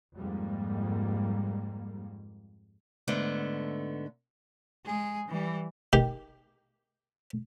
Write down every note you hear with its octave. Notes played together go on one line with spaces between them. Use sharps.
F2 G#2 G3 A#3
G#2 D3 A3 B3
G#3 G#4
E3 G3
D#3 G4